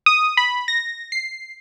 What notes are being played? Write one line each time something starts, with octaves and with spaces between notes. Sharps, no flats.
D#6
B5
A#6
C7